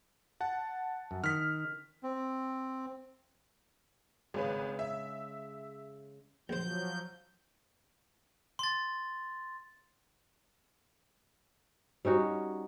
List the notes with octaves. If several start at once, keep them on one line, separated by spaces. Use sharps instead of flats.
F#5 A5
F#2
D#3 F6 B6
C4
G#1 C#3 G#3 B4
E5
A#1 F3 F#3 C5 G6
C6 A6
G3 C#4 D#4 F#4